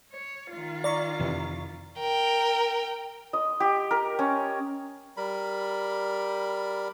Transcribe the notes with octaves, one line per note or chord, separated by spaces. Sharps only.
C#5
D#3 F4
D5 A#5 C#6
F2 C3 E3
A#4 G5
D#5
G4
A#4
C#4
G3 A#4 B5